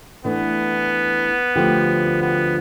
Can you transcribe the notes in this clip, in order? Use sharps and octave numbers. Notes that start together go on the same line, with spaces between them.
E3 A3 B3 D4
D2 D3 F3 C4 G4
B3